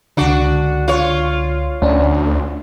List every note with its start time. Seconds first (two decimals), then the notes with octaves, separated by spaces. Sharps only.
0.17 C#2 D3 D4 F#4
0.88 F4 C#5
1.82 D2 C#4 D4